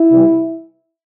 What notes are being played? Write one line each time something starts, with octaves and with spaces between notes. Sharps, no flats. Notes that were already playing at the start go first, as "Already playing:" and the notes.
Already playing: E4
C3 E3 G3